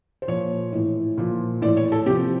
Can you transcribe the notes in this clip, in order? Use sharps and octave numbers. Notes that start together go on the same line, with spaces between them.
C5
A#2 F3 C#5
A2 E3
A#2 F3
A2 E3 D5
C#5
A4
C3 F3 G4